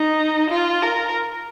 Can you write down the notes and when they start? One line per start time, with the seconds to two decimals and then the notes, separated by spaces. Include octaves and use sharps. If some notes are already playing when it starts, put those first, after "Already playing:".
Already playing: D#4
0.50 F4
0.83 A#4